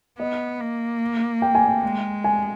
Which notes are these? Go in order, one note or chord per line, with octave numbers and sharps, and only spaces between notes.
B3 D#5
A#3
G5
G#5
G5
G#3
G#5